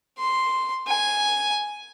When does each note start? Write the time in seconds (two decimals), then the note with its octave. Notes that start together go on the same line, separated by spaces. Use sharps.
0.19 C6
0.87 G#5